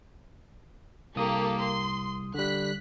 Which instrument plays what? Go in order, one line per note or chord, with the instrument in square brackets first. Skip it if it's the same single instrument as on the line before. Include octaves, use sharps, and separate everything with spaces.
[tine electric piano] C2 D#6 [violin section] A#3 G4 A4
[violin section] C6
[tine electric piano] D3 G3 [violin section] F#6 B6